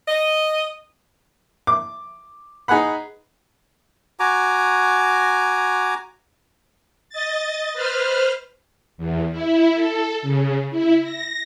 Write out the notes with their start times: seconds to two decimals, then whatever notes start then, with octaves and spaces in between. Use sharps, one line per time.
0.08 D#5
1.67 D6
2.68 D#4 G#4 B4 F#5 B5
4.20 F#4 G#5 A#5 D6
7.09 D#5 A6
7.73 B4 C5 F6
8.97 E2
9.31 E4
9.74 A4
10.22 C#3
10.71 E4
11.02 A#6